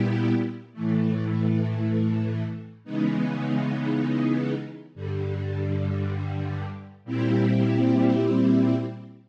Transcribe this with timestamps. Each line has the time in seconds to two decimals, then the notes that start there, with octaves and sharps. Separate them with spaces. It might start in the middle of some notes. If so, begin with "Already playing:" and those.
Already playing: A#2 G3 B3 E4 G4
0.73 A2 E3 A3
2.84 C#3 E3 G#3 B3 D#4
4.95 G2 D3 G3
7.05 A#2 G3 C4 E4 G4